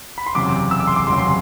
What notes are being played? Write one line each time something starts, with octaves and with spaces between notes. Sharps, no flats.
B5
C6
F#1 E2 C3 F#3 D6
E6
D6
C6
D6
F#1 E2 C3 F#3 C6
C6